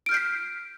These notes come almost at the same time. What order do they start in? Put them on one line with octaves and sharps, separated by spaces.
D7 F6 G6 C7 B6